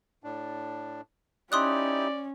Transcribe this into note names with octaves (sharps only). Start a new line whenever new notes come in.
A2 D4
C#4 D#4 E4 G4 D5 C6 D#6 F#6